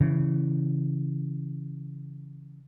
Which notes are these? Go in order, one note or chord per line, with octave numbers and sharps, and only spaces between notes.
C#3 E3